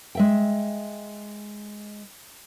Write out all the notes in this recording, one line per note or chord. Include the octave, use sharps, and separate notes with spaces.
G#3 E5 G5